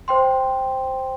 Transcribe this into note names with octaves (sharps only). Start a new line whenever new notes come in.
C5 G5 C6